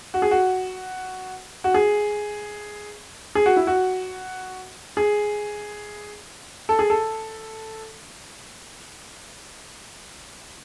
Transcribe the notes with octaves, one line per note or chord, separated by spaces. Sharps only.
F#4
G#4
F#4
F#4
G#4
G#4
F#4
E4
F#4
G#4
A4
G#4
A4